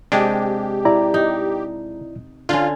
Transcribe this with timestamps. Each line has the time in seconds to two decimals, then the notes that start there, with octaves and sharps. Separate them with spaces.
0.12 C3 G#3 D4 G4
0.85 E4 D5 A#5
1.14 D#4
2.49 D3 C#4 F4